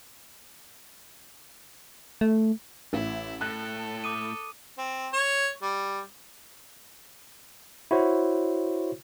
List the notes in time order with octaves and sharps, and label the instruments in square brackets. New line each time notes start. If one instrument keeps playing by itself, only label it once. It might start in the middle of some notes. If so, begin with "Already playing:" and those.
[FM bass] A3
[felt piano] A1 [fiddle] E4
[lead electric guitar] A2 [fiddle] A4 [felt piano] F#6
[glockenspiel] D6 D#6 D#7
[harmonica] C4
C#5
G3
[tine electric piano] E4 F#4 C5 C#5